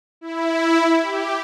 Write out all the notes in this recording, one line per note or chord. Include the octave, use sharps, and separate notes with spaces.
E4
G4